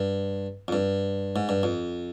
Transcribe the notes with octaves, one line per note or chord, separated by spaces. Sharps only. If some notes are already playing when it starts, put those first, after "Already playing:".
Already playing: G2
F2
G2
G#2
G2
F2